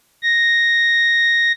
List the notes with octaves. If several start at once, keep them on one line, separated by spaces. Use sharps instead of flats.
A#6